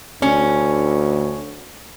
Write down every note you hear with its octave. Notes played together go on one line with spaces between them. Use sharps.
D2 C#4